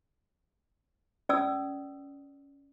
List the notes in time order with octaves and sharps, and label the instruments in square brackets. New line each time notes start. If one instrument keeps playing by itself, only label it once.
[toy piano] C#4 D5 D#6 E6